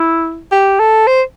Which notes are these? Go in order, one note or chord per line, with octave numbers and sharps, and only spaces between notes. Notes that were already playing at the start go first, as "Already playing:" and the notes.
Already playing: E4
G4
A4
C5